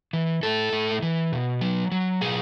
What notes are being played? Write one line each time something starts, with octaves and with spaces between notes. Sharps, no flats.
E3
A2 A4
A2
E3
B2
F#3
F#3
B2 G#4